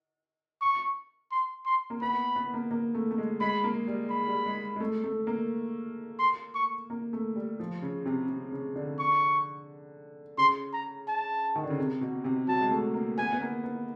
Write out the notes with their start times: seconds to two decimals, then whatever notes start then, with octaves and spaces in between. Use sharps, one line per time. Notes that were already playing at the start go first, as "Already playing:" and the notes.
0.61 C#6
1.32 C6
1.66 C6
1.90 A#3
2.02 B3 B5
2.36 B3
2.54 A#3
2.71 A#3
2.95 A3
3.11 A3
3.18 G#3
3.41 G#3 B5
3.64 A#3
3.88 G3
4.10 B5
4.28 G3
4.46 G#3
4.76 G#3
4.80 A3
5.04 A3
5.27 A#3
6.19 C6
6.55 C#6
6.90 A#3
7.13 A3
7.36 G3
7.60 F3
7.82 C#3
8.06 C3
8.29 C3
8.52 C#3
8.76 D3
8.99 C#6
10.38 C#3 C6
10.73 A#5
11.08 A5
11.55 D#3
11.64 D3
11.70 C#3
11.78 C3
12.01 B2
12.24 C3
12.48 F#3 A5
12.61 G#3
12.71 A3
12.94 A#3
13.18 B3 G#5
13.33 B3
13.41 A#3
13.64 B3